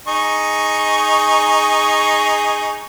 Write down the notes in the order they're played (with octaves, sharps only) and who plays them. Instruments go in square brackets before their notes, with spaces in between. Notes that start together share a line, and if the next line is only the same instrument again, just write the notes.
[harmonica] D#4 G#4 C#6